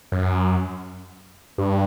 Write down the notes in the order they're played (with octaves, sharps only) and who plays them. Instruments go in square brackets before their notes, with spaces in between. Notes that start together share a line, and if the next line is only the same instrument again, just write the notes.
[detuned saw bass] F#2
G2